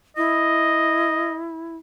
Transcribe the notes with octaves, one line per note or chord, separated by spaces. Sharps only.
E4 D#5